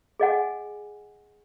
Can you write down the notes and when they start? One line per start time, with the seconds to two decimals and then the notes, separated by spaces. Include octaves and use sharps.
0.20 G#4 D#5 F#5 G#5